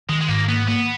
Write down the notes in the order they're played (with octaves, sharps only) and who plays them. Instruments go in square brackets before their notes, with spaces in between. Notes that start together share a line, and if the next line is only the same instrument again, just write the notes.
[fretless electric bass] D#3 [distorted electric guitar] G#3
[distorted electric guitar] G#3
[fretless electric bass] G#2 [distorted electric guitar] A#3
[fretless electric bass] A#3 [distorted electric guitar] B3
[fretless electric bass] A#3 [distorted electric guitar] B3